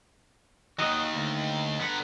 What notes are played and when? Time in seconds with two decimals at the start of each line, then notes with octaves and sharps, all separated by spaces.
0.79 D#2 D#3 F#4 D#5
1.15 D2
1.80 D3 B3 F#5 A#5